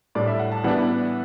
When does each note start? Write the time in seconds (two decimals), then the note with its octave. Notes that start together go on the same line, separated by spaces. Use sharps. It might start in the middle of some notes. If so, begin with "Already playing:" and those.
0.15 A2 G3 D4 D5
0.27 E5
0.40 F#5
0.52 A5
0.64 E3 G3 B3 D4 F#5